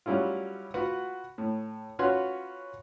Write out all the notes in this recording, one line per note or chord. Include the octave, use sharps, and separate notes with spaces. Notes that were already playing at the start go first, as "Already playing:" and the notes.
F#3 G3 C#4 E4 F4
F4 F#4 B4 F#5
A2
C#4 F4 F#4 B4 C#5 C6